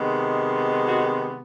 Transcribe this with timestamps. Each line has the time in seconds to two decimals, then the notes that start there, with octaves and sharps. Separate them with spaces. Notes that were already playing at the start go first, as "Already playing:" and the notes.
Already playing: C3 D#3 G#3 B3
0.86 F#4